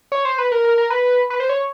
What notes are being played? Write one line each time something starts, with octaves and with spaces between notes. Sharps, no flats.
C#5
C5
B4
A#4
A#4
A#4
B4
B4
C5
C#5